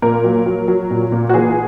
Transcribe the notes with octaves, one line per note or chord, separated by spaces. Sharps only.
A#2 A#4
F#3
F#3
F#3
A#2
A#2
F#4
E3 G#4